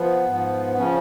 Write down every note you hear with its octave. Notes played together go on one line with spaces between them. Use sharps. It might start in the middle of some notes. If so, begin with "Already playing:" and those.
Already playing: F3 B3
G#2 F3
C#3 F3 C#4